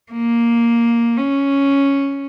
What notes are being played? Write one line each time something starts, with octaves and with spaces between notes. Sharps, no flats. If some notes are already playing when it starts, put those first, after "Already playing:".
A#3
C#4